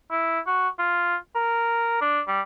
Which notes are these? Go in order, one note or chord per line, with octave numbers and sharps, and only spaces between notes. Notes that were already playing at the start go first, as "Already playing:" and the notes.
E4
F#4
F4
A#4
D4
G3